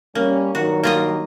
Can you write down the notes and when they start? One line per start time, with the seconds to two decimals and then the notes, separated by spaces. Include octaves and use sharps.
0.15 G3 A#3 C#4
0.55 G2 D#3 F#3 F#4
0.83 A#3 F4 D#5